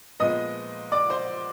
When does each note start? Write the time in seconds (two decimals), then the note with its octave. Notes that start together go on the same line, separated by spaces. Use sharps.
0.20 A#2 F3 G#3 B3 D#5 D#6
0.92 D5 D6
1.10 C5 C6